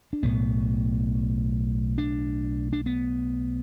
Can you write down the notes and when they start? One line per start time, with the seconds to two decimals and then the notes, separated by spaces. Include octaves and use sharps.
0.13 D4
0.23 B1 A2 B3
1.98 D4
2.73 D4
2.86 B3